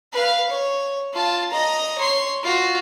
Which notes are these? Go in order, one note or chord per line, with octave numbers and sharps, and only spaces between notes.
B4 F5
C#5
F4 A5
D#5 A#5
C#5 C6
F4 F#4